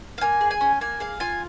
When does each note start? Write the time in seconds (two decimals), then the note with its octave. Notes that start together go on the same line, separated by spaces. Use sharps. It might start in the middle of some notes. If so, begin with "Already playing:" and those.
0.18 F5
0.21 A#3 G#5
0.41 G#4
0.51 G#5
0.61 C#4
0.81 A#3 G#5
1.00 G#4 F5
1.20 F4 G#5